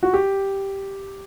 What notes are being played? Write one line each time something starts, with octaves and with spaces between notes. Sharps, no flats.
F#4
G4